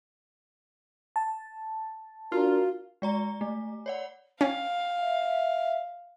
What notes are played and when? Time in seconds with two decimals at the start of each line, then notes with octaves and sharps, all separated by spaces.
1.16 A5
2.32 D4 F4 F#4 A#4
3.02 G#3 D5 A#5
3.41 A3
3.86 C#5 D5 F#5
4.41 C#4 F5 G5
5.00 E5